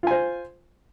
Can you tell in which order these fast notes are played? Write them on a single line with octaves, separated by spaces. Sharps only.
F4 G#5 C5